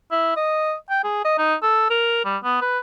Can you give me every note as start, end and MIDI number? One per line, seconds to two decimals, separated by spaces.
0.12 0.35 64
0.36 0.74 75
0.90 1.00 79
1.04 1.25 68
1.25 1.37 75
1.38 1.55 63
1.63 1.87 69
1.90 2.23 70
2.25 2.37 55
2.44 2.57 59
2.61 2.79 71